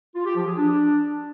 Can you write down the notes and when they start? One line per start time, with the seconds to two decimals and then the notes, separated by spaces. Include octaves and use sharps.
0.15 F4
0.26 G4
0.36 F3
0.47 G#4
0.57 D4